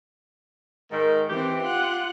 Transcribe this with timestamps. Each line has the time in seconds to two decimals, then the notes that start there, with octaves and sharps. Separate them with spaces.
0.92 G#2 D#3 A#4
1.30 E3 C4 G4
1.62 F4 F#5